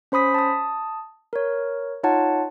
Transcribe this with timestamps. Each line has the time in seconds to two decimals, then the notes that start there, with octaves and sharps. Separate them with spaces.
0.12 C#4 C5 B5 D#6 B6
0.34 A5 D#6
1.33 A#4 C#5
2.03 D#4 F4 C#5 F#5 A5